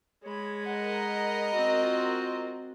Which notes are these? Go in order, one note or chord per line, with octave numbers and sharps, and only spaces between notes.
G#3 C#5 B5
A#4 D#5 F#5
C4 F#4
F4